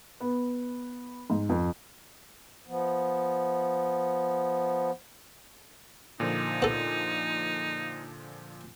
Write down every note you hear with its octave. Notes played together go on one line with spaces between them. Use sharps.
B3
G#2
F2
F3 B3
A#2 D3 F3 D#4
B3 A4